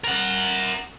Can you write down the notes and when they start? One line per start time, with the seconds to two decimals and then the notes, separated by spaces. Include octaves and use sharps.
0.04 A#4 F#5